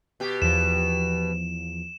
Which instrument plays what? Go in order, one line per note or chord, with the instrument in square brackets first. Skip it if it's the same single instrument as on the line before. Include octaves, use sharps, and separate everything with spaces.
[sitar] B2 G4
[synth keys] E2 F3 [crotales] E7